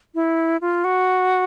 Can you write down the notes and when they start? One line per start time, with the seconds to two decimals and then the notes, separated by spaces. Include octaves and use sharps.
0.15 E4
0.61 F4
0.84 F#4